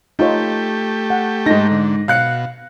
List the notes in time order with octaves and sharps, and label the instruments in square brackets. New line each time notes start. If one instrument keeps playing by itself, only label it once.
[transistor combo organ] A3 G4 [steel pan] D#4 F4 C#5
[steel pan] F#5
[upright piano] G#2 A#6 [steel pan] D#4 A4
[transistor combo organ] D3
[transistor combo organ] B2 F#4 [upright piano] F5 F#6 C#7